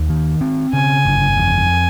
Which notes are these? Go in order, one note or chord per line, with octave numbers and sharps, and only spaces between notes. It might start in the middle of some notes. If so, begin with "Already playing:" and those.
Already playing: D#2
D#3
C4
C#3 G#5
G1
F2